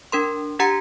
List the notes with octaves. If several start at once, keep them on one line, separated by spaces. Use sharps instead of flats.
D4 A#4 C6
D4 G4 F#5 A#5 G#6 C#7